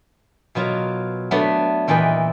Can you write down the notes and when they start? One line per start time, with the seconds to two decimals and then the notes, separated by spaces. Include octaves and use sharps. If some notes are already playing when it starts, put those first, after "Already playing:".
0.55 B2 F#3 F4 A#4
1.31 F#3 A3 B3 D4
1.88 E2 A#2 E3 B4 D#5 G5